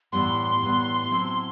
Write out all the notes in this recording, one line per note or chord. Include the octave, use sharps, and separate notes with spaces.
A2 E3 G3 B3 C6
A2 E3 G3 B3
A2 F#3 C4 E4